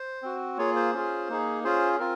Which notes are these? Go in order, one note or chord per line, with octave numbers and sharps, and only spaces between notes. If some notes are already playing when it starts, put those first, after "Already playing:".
Already playing: C5
C4 F#4
A#3 F4 G#4 C#5
C5
C#4 F4 G#4
A#3 D#4 G#4
C#4 F4 G#4 C5
C4 F4 A#4